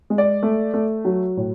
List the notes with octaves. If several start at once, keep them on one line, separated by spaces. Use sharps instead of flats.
G#3
D5
A3
A3
F#3
A2